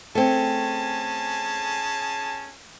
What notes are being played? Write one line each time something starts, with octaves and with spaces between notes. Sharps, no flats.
A3 C4 C#4 G#4 A5